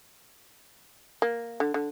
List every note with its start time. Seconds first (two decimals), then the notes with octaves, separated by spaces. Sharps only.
1.22 A#3
1.60 D3
1.74 D3